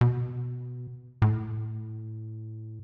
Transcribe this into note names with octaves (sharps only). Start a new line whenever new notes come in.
B2
A2